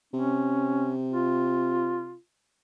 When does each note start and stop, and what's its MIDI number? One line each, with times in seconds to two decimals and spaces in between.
0.13 2.14 48
0.13 0.93 61
1.12 2.18 65